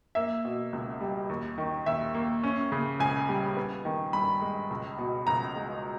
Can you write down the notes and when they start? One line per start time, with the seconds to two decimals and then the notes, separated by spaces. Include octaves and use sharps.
0.15 A#3 E5
0.45 B2
0.73 C#2
1.01 G3
1.29 D#2
1.58 D#3
1.86 D#2 E5
2.14 A#3
2.43 C#4
2.72 C#3
2.99 C#2 G#5
3.29 G3
3.57 B3
3.85 D#3
4.13 G2 B5
4.42 G#3
4.70 C#2
4.98 B2
5.27 C#2 A#5
5.55 G#3